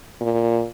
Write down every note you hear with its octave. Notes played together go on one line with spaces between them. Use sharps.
A#2